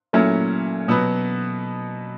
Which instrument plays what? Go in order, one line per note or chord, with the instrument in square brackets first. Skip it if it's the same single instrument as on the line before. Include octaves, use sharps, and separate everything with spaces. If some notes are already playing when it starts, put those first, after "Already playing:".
[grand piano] A#2 F#3 A3 C#4 E4
B2 F#3 B3